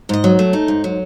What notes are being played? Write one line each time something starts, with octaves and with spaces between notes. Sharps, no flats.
G#2 D#5
F#3
A3
D#4
G#2
F#3